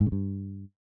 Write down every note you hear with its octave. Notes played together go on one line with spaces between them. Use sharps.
G#2
C#3
G2